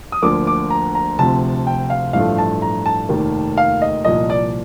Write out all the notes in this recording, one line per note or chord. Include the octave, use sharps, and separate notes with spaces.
D#6
D2 D3 F3 A#3 D6
D6
A#5
A#5
D2 C3 F3 A5
G5
F5
A1 G2 F3 A3 F5
A5
A#5
A5
F1 D#2 D#3 A#3
F5
D#5
C2 A#2 F3 D#5
D5